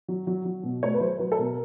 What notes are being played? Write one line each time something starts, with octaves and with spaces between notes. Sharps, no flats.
F#3
F#3
F#3
B2
A3 C#5
B4
F#3 C5
F#3 B4
A4
B2 A#4